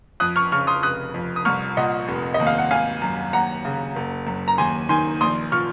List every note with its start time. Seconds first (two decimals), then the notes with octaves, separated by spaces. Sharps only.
0.20 F2 D#6 F#6
0.36 C#6 F6
0.52 C#3 C#6 F6
0.67 C6 D#6
0.83 F1 D#6 F#6
1.14 F2
1.36 D#6
1.45 C2 C#6 F6
1.77 A#2 D#5 F#5
2.08 F1
2.34 D#5
2.40 D#2
2.47 F5
2.58 F#5
2.71 G#1 F5 G#5
3.01 F#2
3.33 D#2 F#5 A#5
3.65 C#3
3.96 F#1
4.27 F#2
4.48 A#5
4.58 D#2 G#5 C6
4.89 D#3 G#5 C6
5.21 A#1 C6 D#6
5.52 A#2 C#6 F6